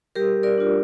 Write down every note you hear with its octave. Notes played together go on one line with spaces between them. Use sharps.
G3 G4 A#4
A#4 D5
D4 F4